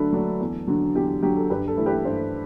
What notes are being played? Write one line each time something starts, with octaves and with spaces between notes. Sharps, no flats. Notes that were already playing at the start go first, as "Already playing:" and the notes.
Already playing: D3 F#3 A3 D4 A4 B4
F#3 A3 D4
E2
D3 F#3
E2 G4
D3 F#3 G4
A4
G2 G4 B4
A4
E3 A3 E4
G4 B4
G2 A4 C5